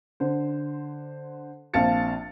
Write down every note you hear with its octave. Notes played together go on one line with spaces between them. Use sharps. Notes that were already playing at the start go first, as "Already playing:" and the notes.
D3 C5
A#1 C4 F5 A5 A6 C#7